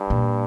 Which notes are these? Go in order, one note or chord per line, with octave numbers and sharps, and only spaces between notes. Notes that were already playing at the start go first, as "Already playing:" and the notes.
Already playing: G2
A#2